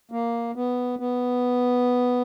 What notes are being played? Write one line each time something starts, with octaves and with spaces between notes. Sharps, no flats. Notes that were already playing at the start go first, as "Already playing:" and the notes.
A#3
B3
B3